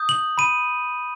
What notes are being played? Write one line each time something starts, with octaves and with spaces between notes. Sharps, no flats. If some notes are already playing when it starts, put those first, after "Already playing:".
Already playing: D#6 G6
F#7
B5 D#7